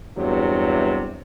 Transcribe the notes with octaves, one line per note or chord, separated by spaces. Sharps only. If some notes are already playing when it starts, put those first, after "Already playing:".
E2 G2 C3 F#3